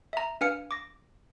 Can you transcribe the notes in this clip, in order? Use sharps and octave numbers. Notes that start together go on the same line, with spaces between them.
E5 A#5
D4 B4 F5 G#5 F6 C#7
D6 A#6